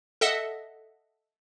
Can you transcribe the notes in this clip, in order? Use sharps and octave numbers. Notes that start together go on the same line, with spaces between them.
A4 D#5 E5 F#5